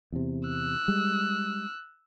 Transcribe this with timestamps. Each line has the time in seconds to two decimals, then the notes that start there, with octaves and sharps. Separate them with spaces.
0.12 E2 C3
0.49 E6 F#6
0.88 G3 G#3